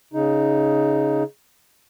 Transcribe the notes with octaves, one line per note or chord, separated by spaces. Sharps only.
C#3 D#4